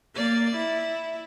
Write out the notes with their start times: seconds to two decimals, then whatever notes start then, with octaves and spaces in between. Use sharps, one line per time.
0.14 A#3 D5
0.56 E4